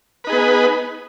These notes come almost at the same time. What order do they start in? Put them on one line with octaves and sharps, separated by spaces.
B4 D#4 G#4 B3